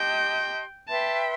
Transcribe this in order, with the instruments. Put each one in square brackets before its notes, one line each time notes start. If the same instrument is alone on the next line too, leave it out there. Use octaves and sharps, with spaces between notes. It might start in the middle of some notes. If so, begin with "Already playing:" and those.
Already playing: [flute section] G4 D#5 A5 C6 [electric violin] G5
[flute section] B4 E5 G5 C6 [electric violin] A5